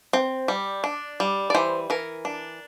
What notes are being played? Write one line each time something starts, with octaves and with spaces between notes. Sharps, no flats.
C4
G3
D4
G3
D5
E3 C5
E3 A#4
D4